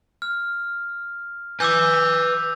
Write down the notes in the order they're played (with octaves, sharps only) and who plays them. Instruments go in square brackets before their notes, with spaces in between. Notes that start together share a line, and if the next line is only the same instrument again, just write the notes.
[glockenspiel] F6
[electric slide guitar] B4 G#5 [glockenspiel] D6 E6 G6